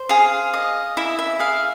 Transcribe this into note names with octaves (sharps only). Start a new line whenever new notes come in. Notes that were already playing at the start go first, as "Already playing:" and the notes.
Already playing: C5
G#4 F5
D#5
E4 E5
E5
G#4 F5